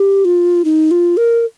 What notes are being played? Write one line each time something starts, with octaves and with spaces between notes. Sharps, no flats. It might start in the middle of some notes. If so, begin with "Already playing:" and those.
Already playing: G4
F4
D#4
F4
A#4